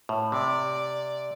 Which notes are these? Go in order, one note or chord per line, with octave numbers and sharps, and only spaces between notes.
A2
C3 D5